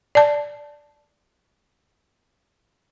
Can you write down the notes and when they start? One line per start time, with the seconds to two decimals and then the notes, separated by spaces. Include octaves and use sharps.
0.15 D5 A5